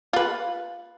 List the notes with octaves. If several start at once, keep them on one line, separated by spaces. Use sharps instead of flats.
F4 B4